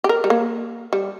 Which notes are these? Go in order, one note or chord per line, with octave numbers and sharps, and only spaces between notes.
G4
A#4
G3
A#3
G3